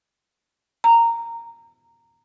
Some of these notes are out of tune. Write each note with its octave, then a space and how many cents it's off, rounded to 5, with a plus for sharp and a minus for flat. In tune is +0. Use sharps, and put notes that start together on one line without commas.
A#5 -10